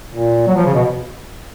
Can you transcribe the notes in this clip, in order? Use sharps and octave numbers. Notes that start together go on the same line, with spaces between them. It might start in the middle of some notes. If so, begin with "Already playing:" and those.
A#2
F#3
F3
C#3
B2